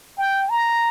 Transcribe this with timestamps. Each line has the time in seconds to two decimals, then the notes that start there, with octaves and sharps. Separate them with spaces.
0.18 G5
0.50 A#5